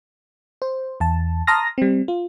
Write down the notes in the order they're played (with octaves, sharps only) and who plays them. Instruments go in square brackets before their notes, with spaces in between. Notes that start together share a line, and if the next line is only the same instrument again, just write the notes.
[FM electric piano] C5
E2 A5
A5 A#5 C6 D#6 F6 A#6
G3 C4
F4